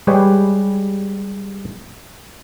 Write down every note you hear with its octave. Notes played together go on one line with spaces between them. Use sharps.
G3 G#3 G4 G#4 B4 C#5